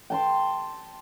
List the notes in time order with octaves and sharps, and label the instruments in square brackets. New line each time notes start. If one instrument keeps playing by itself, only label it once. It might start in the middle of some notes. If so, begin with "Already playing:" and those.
[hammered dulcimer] G5 A5 C6